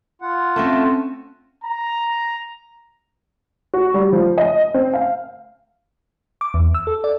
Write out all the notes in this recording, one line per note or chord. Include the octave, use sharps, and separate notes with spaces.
F4 F#5
A3 C4 C#4 A5
A#5
F#4
G3
F3
D#5
C4
F5
D6
E2
E6
A4
D5